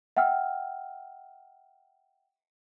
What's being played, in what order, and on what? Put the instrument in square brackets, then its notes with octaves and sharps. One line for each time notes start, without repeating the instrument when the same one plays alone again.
[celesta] E5 F#5 G5 E6 F6